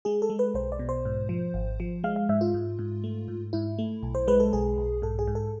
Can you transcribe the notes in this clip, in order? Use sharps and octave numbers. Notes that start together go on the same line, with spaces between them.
G#3 G#4
A4
G#3
B4
B1 C5
D5
B2
C5
G#2
F3
G#1
F3
G#3 F5
F5
G#2 E5
F4
G#2
G#2
A3
G#2
G#2 E4
A3
B1
C5
G#3 B4
A4
B1 G#4
B1
G#2 A4
G#4
G#2
A4